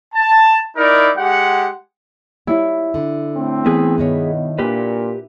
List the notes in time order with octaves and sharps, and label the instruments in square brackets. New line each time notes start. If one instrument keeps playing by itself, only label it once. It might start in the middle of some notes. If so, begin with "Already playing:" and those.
[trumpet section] A5
D#4 E4 A#4 D5
G#3 G4 F#5
[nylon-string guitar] G3 F4 C#5 [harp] E4
[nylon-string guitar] D3
[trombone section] A2 C4
[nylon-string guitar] E3 [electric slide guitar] B3 G#4 B4
[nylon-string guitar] G2 D#3 C#5 [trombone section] B2
[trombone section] A#2 [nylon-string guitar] D4 [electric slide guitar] G4 B4